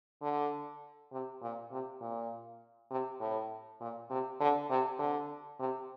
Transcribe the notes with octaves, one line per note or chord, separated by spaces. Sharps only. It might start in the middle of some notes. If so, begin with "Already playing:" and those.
D3
C3
A#2
C3
A#2
C3
A2
A#2
C3
D3
C3
D3
C3